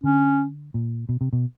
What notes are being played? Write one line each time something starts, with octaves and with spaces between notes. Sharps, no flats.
D3 C#4
A#2
B2
C3
B2